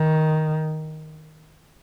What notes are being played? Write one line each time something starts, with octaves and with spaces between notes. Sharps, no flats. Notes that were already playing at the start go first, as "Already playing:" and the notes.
Already playing: D#3